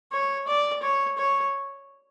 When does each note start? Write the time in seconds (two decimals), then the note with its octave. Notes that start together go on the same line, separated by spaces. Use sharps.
0.13 C#5
0.48 D5
0.83 C#5
1.18 C#5